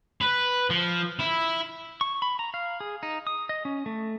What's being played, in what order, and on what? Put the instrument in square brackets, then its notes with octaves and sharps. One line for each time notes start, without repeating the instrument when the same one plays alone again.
[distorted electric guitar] B4
F3
E4
[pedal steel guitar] C#6
B5
A#5
F5
G#4
D#4
D#6
D#5
C#4
A3